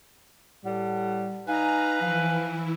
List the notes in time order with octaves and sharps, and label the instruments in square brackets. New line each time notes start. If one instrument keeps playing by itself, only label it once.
[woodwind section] A2 A4 F#5 [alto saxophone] G3
[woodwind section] D#4 F5 [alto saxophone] B4 [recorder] G#5 [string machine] A#5
[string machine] E3 E4 [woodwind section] F3 F5